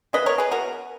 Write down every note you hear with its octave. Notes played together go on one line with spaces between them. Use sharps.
C#3 E3 B3 B4 D#5
A#4 C#5
G#4 B4
E3 B3 F#4 A#4